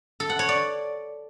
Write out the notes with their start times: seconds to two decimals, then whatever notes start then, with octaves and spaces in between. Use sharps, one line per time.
0.20 A4
0.30 F#5
0.39 C#5
0.49 D5